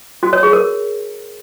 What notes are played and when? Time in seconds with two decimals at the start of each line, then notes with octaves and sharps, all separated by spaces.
0.23 F#4
0.33 C#5
0.43 G#4
0.53 A#4